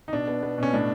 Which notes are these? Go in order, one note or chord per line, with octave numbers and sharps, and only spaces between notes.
D#4
B2 D4
B3
B3
B2 C#4
A2 D4